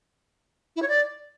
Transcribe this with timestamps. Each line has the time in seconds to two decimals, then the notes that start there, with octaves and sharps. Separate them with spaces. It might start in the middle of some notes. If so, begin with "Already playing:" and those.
0.76 E4
0.82 C#5
0.88 D5